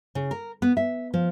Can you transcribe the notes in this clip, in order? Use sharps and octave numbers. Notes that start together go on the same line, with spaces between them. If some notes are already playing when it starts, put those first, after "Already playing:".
C#3
A#4
B3
E5
F3